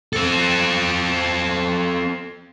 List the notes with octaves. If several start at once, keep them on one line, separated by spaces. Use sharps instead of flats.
C4 A4